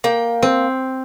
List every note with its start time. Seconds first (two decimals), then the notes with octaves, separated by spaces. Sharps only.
0.04 A#3 G5
0.43 C4